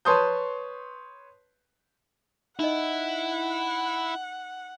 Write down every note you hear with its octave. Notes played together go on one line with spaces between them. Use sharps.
B4 C#5 A5 C6 D#6 G6
D#4 E4 D#5 F#5